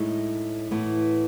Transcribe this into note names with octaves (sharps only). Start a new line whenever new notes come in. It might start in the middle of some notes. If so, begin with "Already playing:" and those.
Already playing: A2 G#3 D#4
A2 E3 B3